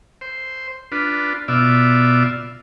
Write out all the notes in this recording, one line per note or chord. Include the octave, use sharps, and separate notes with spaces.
C5
D4 F4 B4
B2 F4 D5 E5